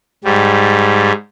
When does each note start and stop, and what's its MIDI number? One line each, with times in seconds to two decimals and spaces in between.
0.24 1.12 44
0.24 1.12 55